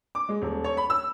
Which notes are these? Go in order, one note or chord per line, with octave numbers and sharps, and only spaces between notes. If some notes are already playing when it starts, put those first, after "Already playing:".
D6
G#3
D#1
C#5
B5
E6